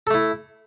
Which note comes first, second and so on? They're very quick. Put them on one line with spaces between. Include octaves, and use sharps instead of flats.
A4 A3 E4